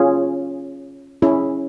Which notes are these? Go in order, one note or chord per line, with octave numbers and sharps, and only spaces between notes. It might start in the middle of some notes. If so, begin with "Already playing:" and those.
Already playing: C#4 F4 G#4
C#4 E4 G#4